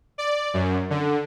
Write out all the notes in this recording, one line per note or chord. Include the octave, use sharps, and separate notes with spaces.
D5
F#2
D3